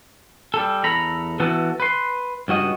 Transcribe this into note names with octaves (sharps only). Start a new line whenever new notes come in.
G3 A4
E2 A4 A#5 B5
E3 B3 F#4 A4
B4 C6
C#2 G2 F#4 D#5